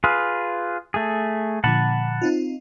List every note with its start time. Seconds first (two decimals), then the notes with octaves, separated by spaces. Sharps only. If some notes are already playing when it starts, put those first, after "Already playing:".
0.04 F4 G#4 B4
0.94 A3 G#4
1.64 A#2 D3 F3 F#5 A5 B5
2.22 C4 D#4 F4